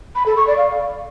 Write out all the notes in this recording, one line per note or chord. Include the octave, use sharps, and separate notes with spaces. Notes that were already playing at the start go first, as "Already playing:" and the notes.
B5
A4
C#6
D5
F5